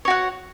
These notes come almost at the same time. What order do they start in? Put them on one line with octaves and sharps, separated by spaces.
C#5 F#4 F#5